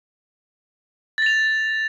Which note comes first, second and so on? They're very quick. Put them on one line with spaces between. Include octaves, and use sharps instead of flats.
A6 A#6 F7